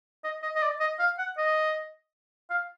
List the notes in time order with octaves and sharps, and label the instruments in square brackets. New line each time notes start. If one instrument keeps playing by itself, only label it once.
[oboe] D#5
D#5
D#5
D5
D#5
F5
F#5
D#5
F5